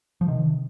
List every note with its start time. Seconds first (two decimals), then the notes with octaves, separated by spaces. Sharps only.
0.21 F3
0.28 C3 D#3